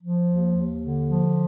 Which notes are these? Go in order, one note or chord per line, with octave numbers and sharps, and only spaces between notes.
F3
D#2
D#2
D3
F3